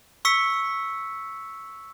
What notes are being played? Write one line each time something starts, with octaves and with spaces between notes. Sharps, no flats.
C#6 E6 B6 C#7